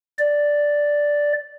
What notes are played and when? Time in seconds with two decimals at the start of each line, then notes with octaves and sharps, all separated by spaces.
0.19 D5